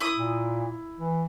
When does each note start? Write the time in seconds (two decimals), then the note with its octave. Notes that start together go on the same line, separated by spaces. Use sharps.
0.01 E4 D#6
0.16 A#2
0.99 E3